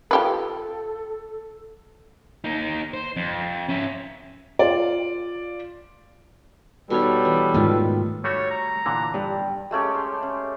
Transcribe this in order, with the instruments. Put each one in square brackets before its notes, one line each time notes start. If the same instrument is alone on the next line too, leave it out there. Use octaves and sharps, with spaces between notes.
[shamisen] F3 G4 B4 [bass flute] A4
[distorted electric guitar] A#3 D#4
C5
F2
C#4 E5
[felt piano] F4 D5
[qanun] B2 D#4 C#5 [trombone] G3 [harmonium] A4 B4
[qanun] E3
[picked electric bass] G#2 G#3 A3 [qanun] D#3 F4
[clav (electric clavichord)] G3 A3 F#4 [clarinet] C#5
[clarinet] A#5
[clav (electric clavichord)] A#2 D3 E3
[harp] G2
[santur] G#3 A3 C#4 G4
C6
C#4